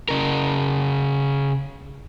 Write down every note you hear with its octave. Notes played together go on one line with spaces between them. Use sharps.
C#3 A#4